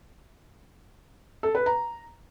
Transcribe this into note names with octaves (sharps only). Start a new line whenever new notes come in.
A4
B4
A#5